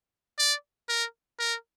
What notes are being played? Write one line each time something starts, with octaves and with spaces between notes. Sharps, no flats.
D5
A#4
A#4